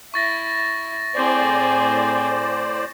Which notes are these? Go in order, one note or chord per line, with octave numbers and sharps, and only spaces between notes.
E4 C#6 A6 A#6
A2 C4 G#4 C5 D5